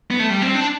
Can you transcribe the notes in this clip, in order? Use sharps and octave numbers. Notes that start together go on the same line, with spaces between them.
B3
A3
G3
C4
D4